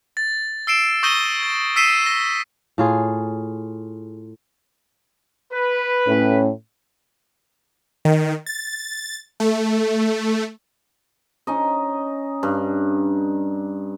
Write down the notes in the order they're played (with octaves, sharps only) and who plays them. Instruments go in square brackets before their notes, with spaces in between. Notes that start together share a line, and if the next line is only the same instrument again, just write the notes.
[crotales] A6
E6 C7 D7 E7
C#6 D#6 G6 A#6 D#7 G7
A6
E6 B6 C7 D#7 E7
A#6
[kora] A2 F4 G#4
[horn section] B4
[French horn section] A2 C#4
[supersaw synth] D#3
A6
A3
[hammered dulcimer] C#4 D#4 D#5
G2